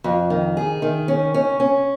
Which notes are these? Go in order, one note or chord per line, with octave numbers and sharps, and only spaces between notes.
F2
D#3
G#4
D#3
C#4
C#4
C#4